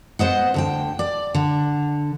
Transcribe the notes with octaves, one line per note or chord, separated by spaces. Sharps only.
B3 C5 D#5 F#5
D2 D3 G5
D5
D3